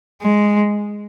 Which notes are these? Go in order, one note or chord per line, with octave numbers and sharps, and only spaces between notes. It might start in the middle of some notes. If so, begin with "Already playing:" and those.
G#3